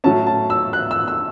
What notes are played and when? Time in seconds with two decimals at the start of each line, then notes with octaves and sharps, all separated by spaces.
0.04 A2 F#3 C#4 A5
0.27 A5
0.50 E6
0.73 F#6
0.91 E6
1.08 E6